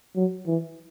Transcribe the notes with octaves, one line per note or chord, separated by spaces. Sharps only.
F#3
E3